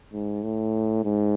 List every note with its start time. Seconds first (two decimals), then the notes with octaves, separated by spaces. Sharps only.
0.13 G#2
0.44 A2
1.05 G#2